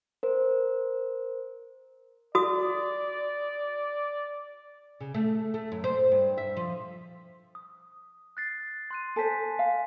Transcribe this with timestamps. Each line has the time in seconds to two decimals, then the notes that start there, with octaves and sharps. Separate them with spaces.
0.23 A#4 C5
2.35 F#4 D5 D#6
5.00 C#3
5.14 A3
5.54 A3
5.72 F#2
5.84 C5
6.12 G2
6.38 E5
6.57 F3
7.55 D#6
8.37 F#6 A6 C7
8.91 C6 F#6 D#7
9.16 A4 C5 G#5 A5 B6
9.59 F5